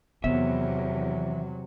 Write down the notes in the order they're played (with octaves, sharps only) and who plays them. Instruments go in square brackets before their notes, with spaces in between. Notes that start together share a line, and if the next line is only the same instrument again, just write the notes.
[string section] E2 [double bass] C3 F#3 [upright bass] D#3 B3 [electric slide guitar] E3 C#5 E5